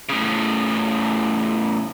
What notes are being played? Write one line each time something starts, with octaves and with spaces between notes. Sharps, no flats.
A2 C#3